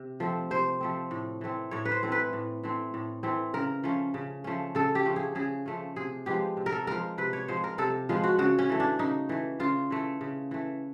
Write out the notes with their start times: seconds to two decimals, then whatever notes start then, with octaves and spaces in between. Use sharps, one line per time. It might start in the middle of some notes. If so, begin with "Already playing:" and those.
Already playing: C3
0.20 F3 A3 C4
0.50 C3 C5
0.81 F3 A3 C4
1.11 A2
1.41 E3 A3 C4
1.71 A2 C#5
1.85 B4
1.92 C5
2.02 E3 A3 C4
2.12 B4
2.33 A2
2.63 E3 A3 C4
2.94 A2
3.23 E3 A3 C4
3.54 C#3 A#4
3.84 F3 A3 C#4
4.14 C#3
4.44 F3 A3 C#4
4.75 C#3 A4
4.95 G4
5.06 F3 A3 C#4
5.16 G#4
5.35 C#3 G#4
5.66 F3 A3 C#4
5.96 C3 G#4
6.26 F3 G#3 B3 G4
6.57 C3
6.66 A#4
6.72 A4
6.87 F3 G#3 B3 A#4
7.18 C3 B4
7.33 C#5
7.48 F3 G#3 B3 C5
7.64 A#4
7.78 C3 A4
8.09 F3 G#3 B3 F4
8.24 F#4
8.39 C#3 F#4
8.59 C#4
8.69 E3 A3
8.80 D4
8.99 C#3 D#4
9.29 E3 A3
9.60 C#3 F4
9.90 E3 A3
10.21 C#3
10.51 E3 A3